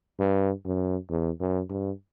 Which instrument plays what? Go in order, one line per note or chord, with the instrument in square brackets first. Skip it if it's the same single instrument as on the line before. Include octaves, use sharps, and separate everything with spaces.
[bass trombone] G2
F#2
E2
F#2
G2